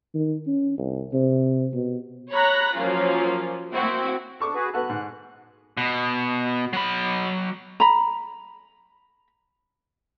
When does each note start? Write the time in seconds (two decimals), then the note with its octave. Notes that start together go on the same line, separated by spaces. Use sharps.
0.15 D#3
0.47 C#4
0.78 C2
1.13 C3
1.73 B2
2.32 C#5 A#5 B5 F#6 A#6
2.75 F3 F#3 A#3 C#4 F4
3.73 A#3 C4 E4 F#4
4.40 D4 A4 C#6 D6
4.54 F#4 G#4 B4
4.74 B3 F#4 A4 F#6
4.90 G#2
5.77 B2
6.73 F#3 B5
7.80 A#5 B5